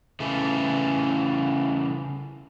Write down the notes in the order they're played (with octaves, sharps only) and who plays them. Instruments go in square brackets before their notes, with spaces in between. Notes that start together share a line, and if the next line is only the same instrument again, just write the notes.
[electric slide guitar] C#3 E3 A3